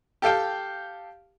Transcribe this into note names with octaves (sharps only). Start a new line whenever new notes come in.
G4 A4 F5 G5